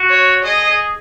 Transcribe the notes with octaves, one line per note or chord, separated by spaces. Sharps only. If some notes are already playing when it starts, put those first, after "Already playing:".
Already playing: F#4
C#5
G#4 D#5
G#4